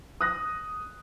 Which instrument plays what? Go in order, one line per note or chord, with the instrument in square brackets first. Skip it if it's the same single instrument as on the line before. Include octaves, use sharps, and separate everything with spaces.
[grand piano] D#6 F#6 A#6